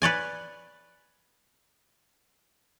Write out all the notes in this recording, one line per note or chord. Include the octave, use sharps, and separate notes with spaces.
B4 C#5 D5 G#5